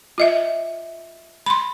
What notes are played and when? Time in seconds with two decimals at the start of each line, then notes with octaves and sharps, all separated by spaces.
0.18 F4 D#5 E5
1.46 B5 C6